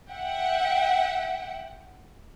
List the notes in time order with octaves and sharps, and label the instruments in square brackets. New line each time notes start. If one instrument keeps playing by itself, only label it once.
[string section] E5 F#5 G5